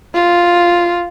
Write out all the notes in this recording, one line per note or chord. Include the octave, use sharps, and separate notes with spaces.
F4